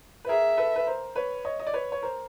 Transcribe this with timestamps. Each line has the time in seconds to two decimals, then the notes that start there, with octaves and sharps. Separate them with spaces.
0.25 B4
0.29 G#4 A#4 E5
0.57 A4 B4
0.76 B4
0.87 A#4 C5
1.16 B4 C#5
1.45 C#5 D#5
1.60 D#5
1.67 D5
1.74 B4 C#5
1.92 C#5
2.03 A#4 C5